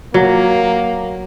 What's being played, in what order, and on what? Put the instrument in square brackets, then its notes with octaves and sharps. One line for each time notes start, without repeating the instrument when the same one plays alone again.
[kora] F#3 [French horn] A#3